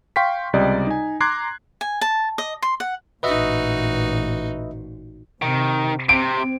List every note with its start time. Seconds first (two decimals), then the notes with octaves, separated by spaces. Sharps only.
0.16 F5 G5 C6 C#6 B6
0.53 C#2 C3 G3 D5 D#5
0.87 D#4 G#5
1.20 A#5 C6 D6 F#6 G#6 C7
1.81 G#5
2.01 A5
2.38 D#5
2.62 C6
2.80 F#5
3.23 A1 A#2 D#4 F#4 B4 D#5 E5
5.42 C3 D#3
6.09 C3 C4 D7